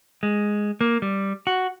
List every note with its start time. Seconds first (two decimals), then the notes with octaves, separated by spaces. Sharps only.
0.23 G#3
0.81 A#3
1.02 G3
1.47 F#4